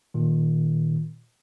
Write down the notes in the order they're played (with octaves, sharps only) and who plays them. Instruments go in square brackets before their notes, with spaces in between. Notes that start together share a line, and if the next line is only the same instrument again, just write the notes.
[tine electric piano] A#2 D#3